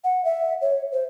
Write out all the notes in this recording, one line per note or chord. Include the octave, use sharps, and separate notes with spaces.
F#5
E5
C#5
C5